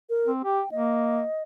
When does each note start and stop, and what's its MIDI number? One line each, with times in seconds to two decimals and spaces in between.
0.10 0.31 70
0.26 0.40 60
0.44 0.61 67
0.44 0.69 79
0.72 1.23 58
0.72 1.43 75